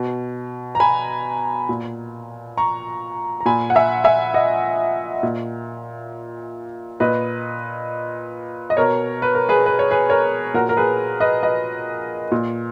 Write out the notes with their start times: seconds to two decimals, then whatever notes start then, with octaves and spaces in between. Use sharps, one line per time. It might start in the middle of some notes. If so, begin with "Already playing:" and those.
Already playing: B2
0.75 A#5
0.80 G#5 B5
1.69 A#2
2.57 A#5 C#6
3.41 A#5
3.45 A#2 G#5 B5
3.70 F#5
3.75 E5 G#5
4.04 E5 G#5
4.34 D#5 F#5
5.23 A#2
7.00 A#2 B4 D#5
8.70 D#5
8.77 B2 A#4 C#5
9.22 B4
9.35 A#4
9.49 G#4 B4
9.66 B4
9.79 C#5
9.91 G#4 B4
10.10 A#4 C#5
10.54 A#2 F#4 A#4
10.69 A#4
10.77 G#4 B4
11.20 B4 D#5
11.43 B4 D#5
12.32 A#2